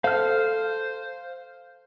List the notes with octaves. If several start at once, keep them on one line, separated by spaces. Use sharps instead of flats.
A4 C5 F5 F6